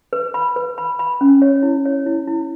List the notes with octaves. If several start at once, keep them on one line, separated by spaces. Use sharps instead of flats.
B4
B5
B4
B5
B5
C#4
C#5
E4
C#5
E4
E4